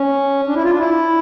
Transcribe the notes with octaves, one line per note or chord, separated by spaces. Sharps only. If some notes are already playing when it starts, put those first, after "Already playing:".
Already playing: C#4
D4
E4
F4
D4
E4